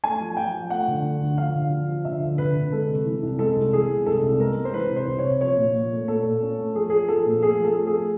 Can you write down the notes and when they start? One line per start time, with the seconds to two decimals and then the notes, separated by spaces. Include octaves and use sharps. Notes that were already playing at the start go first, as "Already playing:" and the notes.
0.04 A3 G#5
0.20 F3
0.37 F3 G5
0.54 F3
0.70 A3 F#5
0.88 D3
1.04 A3
1.21 D2
1.38 F3 F5
1.55 D3
1.71 F3
1.88 F3
2.05 D3 E5
2.22 D2
2.38 D3 B4
2.56 D3
2.72 G#3 A4
2.88 C3
3.05 E3
3.23 C2
3.39 G#3 A4
3.56 C2
3.73 E3 G#4
3.90 G#3
4.06 C2 A4
4.23 C2
4.40 G#3 A#4
4.56 G#3
4.65 C5
4.74 E3 B4
4.91 C3
4.96 C5
5.07 C2
5.19 C#5
5.24 C3
5.41 F3 C#5
5.57 A#2
5.74 A#2
5.91 A3
6.08 A#2 A4
6.25 A#2
6.42 C#4
6.58 A3
6.75 F3 G#4
6.90 F3 G#4
7.09 F3 A4
7.26 A#2
7.42 A3 G#4
7.59 F3
7.65 A4
7.76 A3
7.87 G#4
7.93 A3